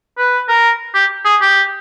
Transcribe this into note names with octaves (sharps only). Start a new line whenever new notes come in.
B4
A#4
G4
G#4
G4